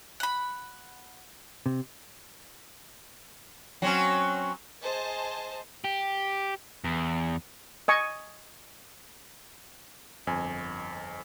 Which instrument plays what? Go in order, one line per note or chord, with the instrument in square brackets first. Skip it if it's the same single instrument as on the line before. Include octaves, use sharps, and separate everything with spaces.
[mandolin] F#5 B5
[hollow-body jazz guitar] C3
[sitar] F#3 C4 C#4
[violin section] G#4 C5 D#5 A5
[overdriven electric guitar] G4
E2
[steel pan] D#5 G#5 C#6
[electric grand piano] G1 F2 G#5